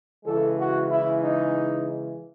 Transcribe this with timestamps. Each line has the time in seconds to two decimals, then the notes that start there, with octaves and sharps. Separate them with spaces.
0.25 C#3 E3 G#3 A4
0.57 F#4
0.88 E4
1.20 D#4